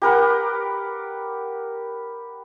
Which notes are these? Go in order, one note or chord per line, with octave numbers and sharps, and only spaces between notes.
G4 A#4 B4 F#5